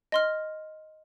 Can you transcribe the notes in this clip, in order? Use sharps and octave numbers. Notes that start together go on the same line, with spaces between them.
D#5 C6 F6